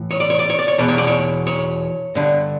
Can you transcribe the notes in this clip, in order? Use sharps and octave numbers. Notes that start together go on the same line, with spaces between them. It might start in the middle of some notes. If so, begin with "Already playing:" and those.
Already playing: A2 E3
C#5
D5
C#5
D5
C#5
D5
C#5
E2 B2 D5
C#5
D5
C#5
C#5
G2 D3